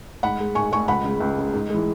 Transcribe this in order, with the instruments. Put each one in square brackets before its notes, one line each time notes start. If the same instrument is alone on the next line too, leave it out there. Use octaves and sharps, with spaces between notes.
[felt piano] G#2 F#5 B5
G#3
G#2 G#5 C#6
G#3 G#5 C#6
C#2 F#5 B5
C#3 G#3
C#2
C#3 G#3
G#2
E3 G#3